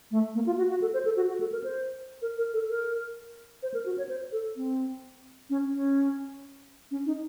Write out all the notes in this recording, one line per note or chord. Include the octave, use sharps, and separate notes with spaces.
A3
A#3
F4
F#4
F#4
A4
C5
A4
F#4
F#4
A4
A#4
C5
A#4
A#4
A4
A#4
C5
A#4
F#4
C#5
C5
A4
C4
C#4
C#4
C#4
D#4